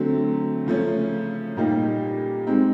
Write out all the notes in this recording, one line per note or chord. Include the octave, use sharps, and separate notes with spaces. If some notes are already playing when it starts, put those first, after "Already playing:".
Already playing: D3 F#3 A3 C4
C#3 F3 A3 C#4
A#2 G3 A#3 D#4 G4
G#3 C4 D#4